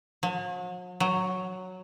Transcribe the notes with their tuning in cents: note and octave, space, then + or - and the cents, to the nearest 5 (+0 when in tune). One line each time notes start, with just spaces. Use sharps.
F#3 -45
F#3 +0